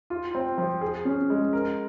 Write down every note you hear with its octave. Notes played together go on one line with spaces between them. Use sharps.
F4
C4
F3
G#4
C#4
G#3
A#4